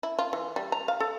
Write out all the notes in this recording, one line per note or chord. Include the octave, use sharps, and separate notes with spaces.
E4
F4
E3
G3
A#5
F5
A4